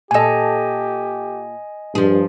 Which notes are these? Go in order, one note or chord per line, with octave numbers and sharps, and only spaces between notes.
A#2 G4 A4 D#5 G#5
G2 F3 G#4